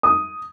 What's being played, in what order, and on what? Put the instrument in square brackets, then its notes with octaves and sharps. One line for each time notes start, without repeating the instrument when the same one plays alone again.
[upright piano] D#6